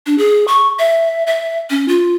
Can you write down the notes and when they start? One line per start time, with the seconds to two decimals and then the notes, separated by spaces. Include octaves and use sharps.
0.06 D4
0.18 G#4
0.48 C#6
0.79 E5
1.27 E5
1.70 C#4
1.88 F4